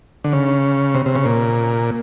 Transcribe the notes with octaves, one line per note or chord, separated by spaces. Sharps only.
D3
C#3
C3
C3
C#3
A#2